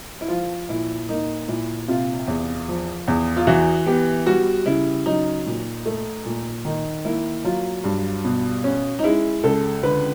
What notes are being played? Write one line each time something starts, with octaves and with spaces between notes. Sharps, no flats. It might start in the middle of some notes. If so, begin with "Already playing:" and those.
E4
F3 F4
A#2 E4
A#3 D#4
A#2 E4
C3 F4
E2
F3
E2
F4
E3 F#4
B3 G4
G3 F#4
C#3 E4
F#3 D#4
A#2
A3
A#2
D#3 D#4
A#3 E4
F#3 F4
G2
B2
C#4
D#4
G#3 E4
C#2 A4
D3 B4